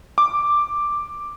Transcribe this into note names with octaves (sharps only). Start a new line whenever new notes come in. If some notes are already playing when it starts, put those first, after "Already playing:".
D6